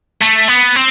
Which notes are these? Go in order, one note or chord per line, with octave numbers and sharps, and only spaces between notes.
A3
B3
C4